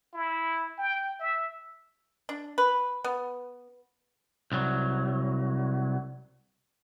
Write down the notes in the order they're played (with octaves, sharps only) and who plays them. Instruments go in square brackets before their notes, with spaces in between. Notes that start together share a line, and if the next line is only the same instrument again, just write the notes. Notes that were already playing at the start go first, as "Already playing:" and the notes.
[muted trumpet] E4
G5
E5
[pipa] D4
B4
B3
[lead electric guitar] C2 F#3